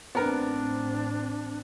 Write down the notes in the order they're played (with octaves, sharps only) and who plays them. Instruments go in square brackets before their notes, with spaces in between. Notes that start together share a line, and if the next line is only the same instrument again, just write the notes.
[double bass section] A1 C4 [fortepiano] B3 A#4 [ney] D4